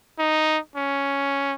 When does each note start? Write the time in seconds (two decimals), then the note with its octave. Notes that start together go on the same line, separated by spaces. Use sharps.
0.19 D#4
0.76 C#4